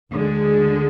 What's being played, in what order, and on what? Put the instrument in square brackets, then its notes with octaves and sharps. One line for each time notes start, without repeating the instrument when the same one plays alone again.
[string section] D2 D3 G#3